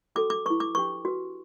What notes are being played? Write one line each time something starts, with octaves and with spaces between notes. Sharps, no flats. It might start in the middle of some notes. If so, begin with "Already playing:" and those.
C#4 F#4 A4 D6
D6
E4 B4 C#6
D6
D4 G4 B4 C#6
F#4 B4